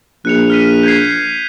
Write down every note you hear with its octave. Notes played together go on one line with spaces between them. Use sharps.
A#1 F#6 C#7 F7
F6 B6 D#7
G6 G#6 C7